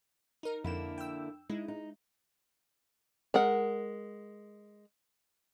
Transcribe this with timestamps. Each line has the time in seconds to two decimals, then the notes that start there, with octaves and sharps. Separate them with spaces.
0.43 D#4 A#4
0.64 F2 D3 A#3 E4 E7
0.98 G5 E6
1.50 G#3 D#4 E4
1.68 D#4
3.34 G#3 A#4 F#5